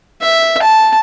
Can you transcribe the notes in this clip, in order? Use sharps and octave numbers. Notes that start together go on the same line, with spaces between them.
E5
A5